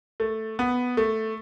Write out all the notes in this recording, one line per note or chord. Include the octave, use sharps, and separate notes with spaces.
A3
B3
A3